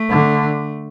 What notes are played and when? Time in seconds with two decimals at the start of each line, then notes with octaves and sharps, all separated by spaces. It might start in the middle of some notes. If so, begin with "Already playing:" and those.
Already playing: A3
0.10 D3